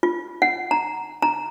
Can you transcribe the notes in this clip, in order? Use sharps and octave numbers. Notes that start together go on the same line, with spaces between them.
F4
F#5
A#5
A#5